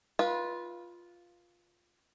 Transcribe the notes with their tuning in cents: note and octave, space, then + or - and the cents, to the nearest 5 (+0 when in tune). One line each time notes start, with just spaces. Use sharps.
F4 +0 B4 -25